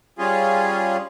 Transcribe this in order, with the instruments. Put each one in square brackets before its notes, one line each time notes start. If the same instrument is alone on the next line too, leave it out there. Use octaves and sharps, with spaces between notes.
[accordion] G3 C#4 F4 G#4